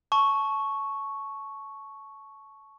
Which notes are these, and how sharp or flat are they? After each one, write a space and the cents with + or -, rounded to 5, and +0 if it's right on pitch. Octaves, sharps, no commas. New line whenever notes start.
A5 -15 C#6 +0